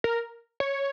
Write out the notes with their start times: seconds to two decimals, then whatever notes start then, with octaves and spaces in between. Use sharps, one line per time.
0.04 A#4
0.60 C#5